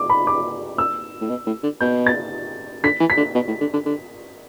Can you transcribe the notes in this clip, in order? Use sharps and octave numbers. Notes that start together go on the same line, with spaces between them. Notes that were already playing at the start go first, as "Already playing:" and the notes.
Already playing: D6
B5
D6
E6
A2
B2
A2
D3
B2 G6
A6
D3 B6
E3
B6
D3
B2
A2
D3
D3
D3